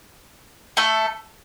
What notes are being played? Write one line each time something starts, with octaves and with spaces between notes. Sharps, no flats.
A3 A4